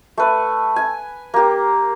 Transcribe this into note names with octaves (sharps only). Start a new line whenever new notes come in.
A3 B4
G#5
A#3 G4